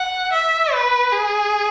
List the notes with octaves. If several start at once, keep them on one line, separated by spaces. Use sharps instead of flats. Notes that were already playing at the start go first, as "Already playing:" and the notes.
Already playing: F#5
E5
B4
G#4